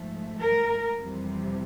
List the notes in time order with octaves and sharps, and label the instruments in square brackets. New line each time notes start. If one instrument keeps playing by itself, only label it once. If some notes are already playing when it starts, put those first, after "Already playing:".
Already playing: [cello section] G#2 F3 A3
A#4
F2 C3 E3 G3